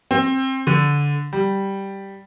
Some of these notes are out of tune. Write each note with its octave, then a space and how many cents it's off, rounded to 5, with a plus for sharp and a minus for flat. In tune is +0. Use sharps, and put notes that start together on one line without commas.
C4 +20
D3 -15
G3 -5